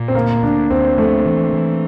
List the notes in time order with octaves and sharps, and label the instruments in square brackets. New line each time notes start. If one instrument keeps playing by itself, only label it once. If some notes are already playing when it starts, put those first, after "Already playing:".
Already playing: [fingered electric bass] A#2
[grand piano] C4
[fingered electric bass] D2 [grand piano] A#3
[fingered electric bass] D2 [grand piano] D4
[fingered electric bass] D2 [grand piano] C4
[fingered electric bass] F3 [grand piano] A3
[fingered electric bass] E3
E3